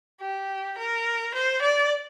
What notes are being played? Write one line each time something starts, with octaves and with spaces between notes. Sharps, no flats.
G4
A#4
C5
D5